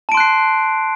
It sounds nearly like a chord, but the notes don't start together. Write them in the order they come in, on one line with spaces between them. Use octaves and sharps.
A5 D7 C6 F#6 C7